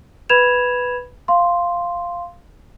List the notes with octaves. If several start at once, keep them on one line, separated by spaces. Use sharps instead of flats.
B4 B5 G#6 E7 F7
F5 C6